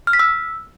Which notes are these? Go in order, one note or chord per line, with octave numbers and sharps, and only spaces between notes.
F6
B6
E6